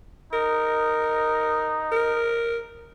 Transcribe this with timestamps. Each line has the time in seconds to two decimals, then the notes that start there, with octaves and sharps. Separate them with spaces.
0.33 D#4 A#4
1.92 A#4